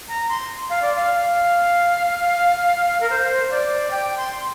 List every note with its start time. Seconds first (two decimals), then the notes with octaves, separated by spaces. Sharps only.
0.09 A#5
0.29 C6
0.70 F5
0.82 D5
0.96 F5
3.01 A#4
3.10 C5
3.51 D5
3.91 G5
4.17 C6